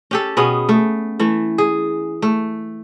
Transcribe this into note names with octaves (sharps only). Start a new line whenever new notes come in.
C#4 G4 A4
B2 B3 C#4 G#4
A3
E3 A3
G#4
A3